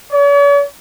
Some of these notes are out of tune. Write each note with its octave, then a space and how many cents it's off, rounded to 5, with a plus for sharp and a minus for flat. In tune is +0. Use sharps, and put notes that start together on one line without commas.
C#5 +45